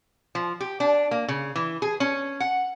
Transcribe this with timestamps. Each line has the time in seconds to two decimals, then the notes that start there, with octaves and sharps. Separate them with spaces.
0.35 F3
0.60 G4
0.80 D4
1.11 A#3
1.28 C#3
1.56 E3
1.82 G#4
2.00 C#4
2.40 F#5